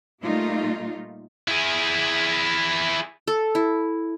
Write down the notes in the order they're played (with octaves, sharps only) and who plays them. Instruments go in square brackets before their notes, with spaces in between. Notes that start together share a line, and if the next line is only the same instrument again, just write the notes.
[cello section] A#2 G3 A3 A#3 D#4 F4
[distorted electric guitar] E4 G#4
[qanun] A4
E4